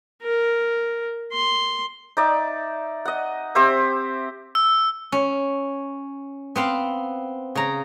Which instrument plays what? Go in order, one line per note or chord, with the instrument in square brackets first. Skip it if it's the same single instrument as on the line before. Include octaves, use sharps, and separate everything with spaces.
[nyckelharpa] A#4
C6
[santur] D#4 D5 E5
D#5 F#5
C4 G4 C5 E5
[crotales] E6
[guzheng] C#4
B3 C4 F5
C#3 A#5